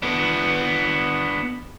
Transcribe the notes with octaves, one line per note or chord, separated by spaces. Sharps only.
B3 D4